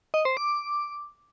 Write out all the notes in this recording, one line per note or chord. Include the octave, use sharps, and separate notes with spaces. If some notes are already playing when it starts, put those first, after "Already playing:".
D#5
C5
D6